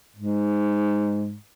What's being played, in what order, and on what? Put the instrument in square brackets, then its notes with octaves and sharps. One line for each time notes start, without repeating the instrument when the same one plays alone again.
[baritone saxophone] G#2